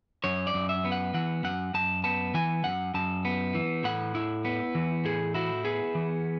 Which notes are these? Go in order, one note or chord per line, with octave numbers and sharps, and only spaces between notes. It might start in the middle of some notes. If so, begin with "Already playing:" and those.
F#2 C#5
D5
F#2
E5
B3
F#5
E3 F#5
F#2 F#5
F#2 A5
B3 A5
E3 G#5
F#2 F#5
F#2 A5
B3
E3
A2 F#5
E4
B3
E3
A2 G#4
E4 F#4
B3 G#4
E3